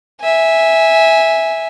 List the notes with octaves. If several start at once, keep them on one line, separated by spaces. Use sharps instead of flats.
E5 G#5